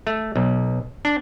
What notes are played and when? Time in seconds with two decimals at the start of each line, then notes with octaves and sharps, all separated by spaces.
0.07 A3
0.36 B1
1.05 D4